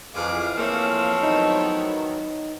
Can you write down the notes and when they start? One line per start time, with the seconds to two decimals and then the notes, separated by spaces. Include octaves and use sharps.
0.14 F2 E3 G#4 F5 D6
0.58 F3 A3 A#3 C4 E4 C#5
1.23 D#3 F#3 B3 D#4